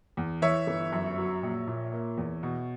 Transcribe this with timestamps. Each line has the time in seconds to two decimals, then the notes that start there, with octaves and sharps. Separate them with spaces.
0.17 E2
0.42 E3 C#5 E5
0.67 G1
0.92 F#2
1.18 F#3
1.43 A#1
1.67 A#2
1.92 A#3
2.17 E2
2.43 B2